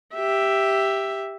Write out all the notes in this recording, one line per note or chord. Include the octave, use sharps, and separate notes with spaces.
G4 E5